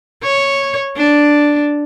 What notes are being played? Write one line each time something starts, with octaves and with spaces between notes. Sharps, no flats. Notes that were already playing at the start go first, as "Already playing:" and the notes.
C#5
D4